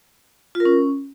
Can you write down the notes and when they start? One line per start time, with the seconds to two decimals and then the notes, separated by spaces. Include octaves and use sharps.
0.55 F4
0.60 A#4
0.65 C#4